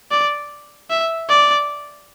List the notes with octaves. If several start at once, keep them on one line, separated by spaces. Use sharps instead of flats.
D5
E5
D5